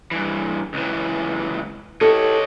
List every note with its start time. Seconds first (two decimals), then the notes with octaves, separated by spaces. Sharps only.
0.11 G2 E3
0.74 C#2 E3
2.01 E4 G4 A4 C#5 D#5